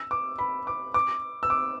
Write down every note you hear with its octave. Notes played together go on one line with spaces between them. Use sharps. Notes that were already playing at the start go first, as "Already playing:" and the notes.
Already playing: E6
D6
B5
D6
D6
E6
D6